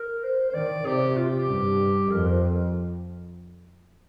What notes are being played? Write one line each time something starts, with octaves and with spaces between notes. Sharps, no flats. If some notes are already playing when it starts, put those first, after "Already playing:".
Already playing: A#4
C5
C5
D#3 D5
C3 G4
F4
G4
G2
F2 A#4
C5